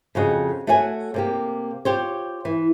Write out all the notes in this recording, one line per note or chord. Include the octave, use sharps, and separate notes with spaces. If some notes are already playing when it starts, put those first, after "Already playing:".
F2 C#3 F#4 D#5
A3 F#4 C#5 F#5 G#5
C3 A#3 G4
F4 G4 C5 C#5
E3